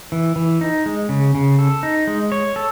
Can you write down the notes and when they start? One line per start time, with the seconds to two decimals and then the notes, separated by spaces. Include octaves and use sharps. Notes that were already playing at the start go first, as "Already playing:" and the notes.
0.12 E3
0.36 E3
0.61 D#4
0.86 G#3
1.09 C#3
1.35 C#3
1.59 A4
1.83 D#4
2.07 G#3
2.32 C#5
2.56 A4